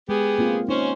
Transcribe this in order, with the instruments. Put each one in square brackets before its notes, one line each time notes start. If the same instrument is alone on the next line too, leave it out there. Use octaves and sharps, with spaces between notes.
[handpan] G#3 [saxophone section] B3 G4 G#4
[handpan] A#3 C4 F4
[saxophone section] C#4 C5 [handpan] D#4